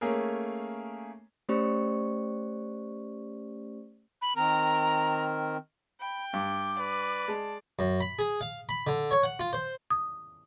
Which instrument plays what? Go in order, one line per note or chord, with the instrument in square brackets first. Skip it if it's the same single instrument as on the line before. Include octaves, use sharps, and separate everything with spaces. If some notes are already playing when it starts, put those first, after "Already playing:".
[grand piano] A3 A#3 C#4 G#4 A#4
[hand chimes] A3 C#4 G4 C5 D5 C#6
[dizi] B5
[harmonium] D#3 C4 A#4 [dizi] A#5
[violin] G5 [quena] B5
[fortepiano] G2 [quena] D6
[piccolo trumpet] B4 [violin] D5
[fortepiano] G#3 [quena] A5
[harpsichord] F#2
B5
G#4
F5
B5
D3
C#5
F#5
F4
C5
[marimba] D#6